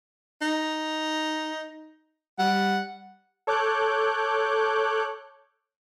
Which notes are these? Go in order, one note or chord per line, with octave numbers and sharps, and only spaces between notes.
D#4
G3 F#5
A4 C#5 D6 F#6 G6